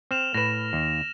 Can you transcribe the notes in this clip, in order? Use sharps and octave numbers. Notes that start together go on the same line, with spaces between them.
C4 F6 E7 F7
A2 B4 A#6 E7
D#2